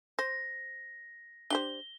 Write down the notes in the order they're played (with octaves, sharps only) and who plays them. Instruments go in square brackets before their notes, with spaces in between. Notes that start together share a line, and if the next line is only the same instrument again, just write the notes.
[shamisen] C5 [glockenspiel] A#6
[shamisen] D4 G4 C5 [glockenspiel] G7